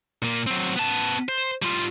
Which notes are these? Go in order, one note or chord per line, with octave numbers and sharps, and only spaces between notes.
A#2 A#3
F#3 C4
B3 A5
C5
G3 F4